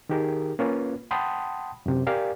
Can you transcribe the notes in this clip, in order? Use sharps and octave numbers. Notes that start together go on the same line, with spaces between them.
D#3 D#4 G4 G#4 A#4
A#3 C#4 F4 B4
F#5 G5 A5 B5 C6 D#6
F#2 C3
G4 A#4 D5 F5 G#5